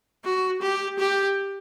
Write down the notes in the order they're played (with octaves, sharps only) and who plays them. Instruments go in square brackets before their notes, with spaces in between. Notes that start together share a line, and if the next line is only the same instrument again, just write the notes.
[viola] F#4
G4
G4